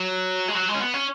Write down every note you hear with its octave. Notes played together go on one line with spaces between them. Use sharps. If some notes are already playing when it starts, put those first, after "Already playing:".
Already playing: F#3
G#3
F#3
G#3
C#4
B3
C#4